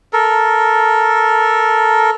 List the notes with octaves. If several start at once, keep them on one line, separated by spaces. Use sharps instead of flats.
A4 A#4